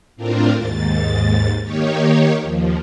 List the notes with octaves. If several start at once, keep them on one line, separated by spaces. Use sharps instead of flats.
A2 C4 D4 F4 A#4
D#2 G#2 A6
D#3 A#3 D#4 G4 C#5
D#2 F3